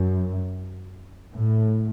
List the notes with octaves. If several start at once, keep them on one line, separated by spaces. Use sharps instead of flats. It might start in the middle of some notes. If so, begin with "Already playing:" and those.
Already playing: F#2
A2